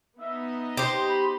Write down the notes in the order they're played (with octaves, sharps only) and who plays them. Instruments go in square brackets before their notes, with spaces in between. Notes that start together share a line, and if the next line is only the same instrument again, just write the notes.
[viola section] B3 D#4 D#5 [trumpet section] E5
[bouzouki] G4 C5 [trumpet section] C6
[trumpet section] B5